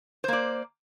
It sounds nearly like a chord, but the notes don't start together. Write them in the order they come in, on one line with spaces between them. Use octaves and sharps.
C5 A#3 D5